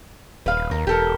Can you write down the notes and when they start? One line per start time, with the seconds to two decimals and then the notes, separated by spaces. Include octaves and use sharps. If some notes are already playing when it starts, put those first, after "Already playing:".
0.46 D#1 B4 F5
0.71 D#2 A#4
0.87 E1 G4 A4 A#4